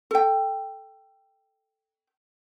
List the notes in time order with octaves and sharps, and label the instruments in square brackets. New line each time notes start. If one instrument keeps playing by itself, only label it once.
[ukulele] A4 G5